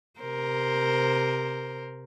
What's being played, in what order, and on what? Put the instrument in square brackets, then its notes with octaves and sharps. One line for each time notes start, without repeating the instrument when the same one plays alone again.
[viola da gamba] C3 A#4 C5